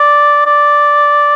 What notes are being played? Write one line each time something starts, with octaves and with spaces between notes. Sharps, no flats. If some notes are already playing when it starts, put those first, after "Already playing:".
Already playing: D5
D5